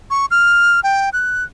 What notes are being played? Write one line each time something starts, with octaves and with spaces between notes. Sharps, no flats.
C#6
F6
G5
F#6